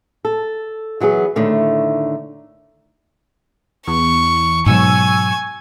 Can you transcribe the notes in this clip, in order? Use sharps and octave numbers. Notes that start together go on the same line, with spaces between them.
A4
E3 F#3 B3 G#4
A2 D3 D#3 A3
E2 C#6
G#2 B2 F#3 G#5 C#6 E6